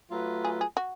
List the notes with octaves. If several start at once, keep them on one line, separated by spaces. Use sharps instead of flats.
F#3 A3 F4 B4
G#4
G#4
F#4